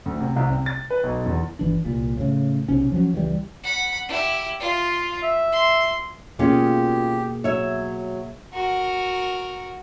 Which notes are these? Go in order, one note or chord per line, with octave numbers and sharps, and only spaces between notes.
D2
C3
C2
C3
A6
B4
B1
E2
G1 E3 D4
C2 A#2
A2 C#3
B1 C3 C#4
F3 F#3 C#4
C#2 E3 F#3 G3
F#5 B5
E4 G4
F4
E5
C6
B2 A#3 C#4 F4 G4 G#4
F#3 C#5 E5
F#4 A#4